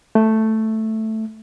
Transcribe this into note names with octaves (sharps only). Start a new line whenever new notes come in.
A3